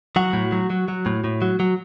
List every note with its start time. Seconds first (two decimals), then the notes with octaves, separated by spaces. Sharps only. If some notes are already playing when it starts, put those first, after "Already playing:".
0.16 F#3 F#4
0.33 A2
0.52 F#3
0.70 F#3
0.88 F#3
1.06 A2
1.24 A2
1.42 F#3
1.60 F#3